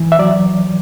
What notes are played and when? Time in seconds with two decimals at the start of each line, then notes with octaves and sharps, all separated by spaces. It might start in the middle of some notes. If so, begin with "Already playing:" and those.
Already playing: E3
0.12 E5
0.19 F#3 D5